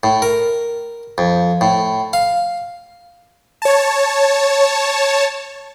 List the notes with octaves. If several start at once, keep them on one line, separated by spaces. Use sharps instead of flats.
A2
A#4
F2
A2
F5
C#5 A5